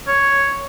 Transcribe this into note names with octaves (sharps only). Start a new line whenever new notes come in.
C#5